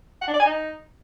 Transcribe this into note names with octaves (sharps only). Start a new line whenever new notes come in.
F#5
D4
D5
G#5
D#4